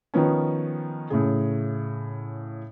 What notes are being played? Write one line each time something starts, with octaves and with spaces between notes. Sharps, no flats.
D#3 F3 B3 C#4
A2 C#3 G#4